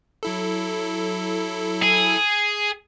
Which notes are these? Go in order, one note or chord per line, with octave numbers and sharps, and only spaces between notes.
F#3 E4 A4
G#4